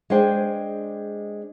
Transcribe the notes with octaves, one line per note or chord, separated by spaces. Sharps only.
G#3 D4 C5 G5 G#5